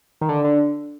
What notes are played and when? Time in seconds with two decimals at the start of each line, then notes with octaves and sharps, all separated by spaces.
0.21 D#3
0.29 D3
0.44 D3